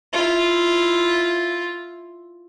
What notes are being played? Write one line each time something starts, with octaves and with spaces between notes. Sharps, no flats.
E4 F4